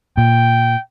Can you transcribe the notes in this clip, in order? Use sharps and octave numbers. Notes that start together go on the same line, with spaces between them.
A#2 G5